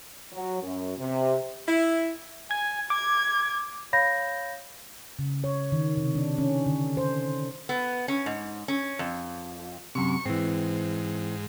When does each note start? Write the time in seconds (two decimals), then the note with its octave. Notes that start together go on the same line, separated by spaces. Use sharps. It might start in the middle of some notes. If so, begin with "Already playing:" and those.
0.32 F#3
0.62 F#2
0.98 C3
1.68 E4
2.51 G#5 G#6
2.90 D6 G#6
3.93 C#5 F5 B5 G6 A#6
5.19 C#3
5.44 C#5
5.72 D#3
5.97 C3
6.15 D4
6.38 C#4
6.66 D3
6.97 C5
7.69 B3
8.08 C#4
8.26 G#2
8.68 C#4
8.99 F2
9.95 F#2 C3 C#6
10.25 G#2 E3 C4